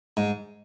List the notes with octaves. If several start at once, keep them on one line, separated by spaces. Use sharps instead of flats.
G#2